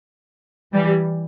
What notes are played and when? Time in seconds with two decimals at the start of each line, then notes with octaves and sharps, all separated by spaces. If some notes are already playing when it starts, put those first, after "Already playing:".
0.74 E3 G3